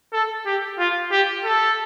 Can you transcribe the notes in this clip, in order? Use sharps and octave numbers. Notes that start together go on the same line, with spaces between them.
A4
G4
F4
G4
A4